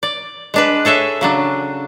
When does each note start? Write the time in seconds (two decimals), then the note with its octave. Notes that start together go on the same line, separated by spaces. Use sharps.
0.03 D5
0.54 G#3 D4 B4
0.85 G#4 A4 C#5 E5
1.21 C#3 F#3 D4